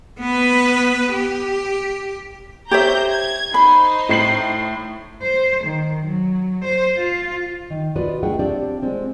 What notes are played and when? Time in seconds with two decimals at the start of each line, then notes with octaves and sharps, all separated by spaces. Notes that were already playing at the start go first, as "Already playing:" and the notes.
0.20 B3 B4
1.14 G4
2.71 G4 C5 C#5 E5 A#5 G6
3.12 G#6
3.54 D#4 C5 B5 C6
4.09 A2 C7 F#7
5.22 C5
5.64 D#3
6.05 F#3
6.64 C5
6.98 F4
7.70 D#3
7.96 F4 F#4 B4 D5 D#5
8.23 A3 D4 G#4 D#5 F#5 G5
8.39 C4 D4 F4 G4 D5
8.82 G#3 C4 D5